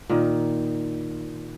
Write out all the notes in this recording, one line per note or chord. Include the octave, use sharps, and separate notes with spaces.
A#2 D#3